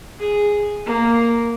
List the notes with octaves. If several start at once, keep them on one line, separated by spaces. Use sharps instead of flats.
G#4
A#3